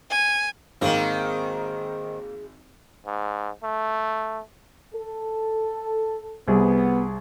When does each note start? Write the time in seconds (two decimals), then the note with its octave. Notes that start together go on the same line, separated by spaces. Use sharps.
0.11 G#5
0.81 G#1 G#2 D#3 A#3 C4 G#4
3.06 G#2
3.63 A3
4.94 A4
6.48 C2 B3 G#4